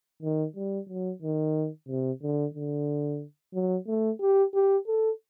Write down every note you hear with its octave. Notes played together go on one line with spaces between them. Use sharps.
D#3
G3
F#3
D#3
C3
D3
D3
F#3
A3
G4
G4
A4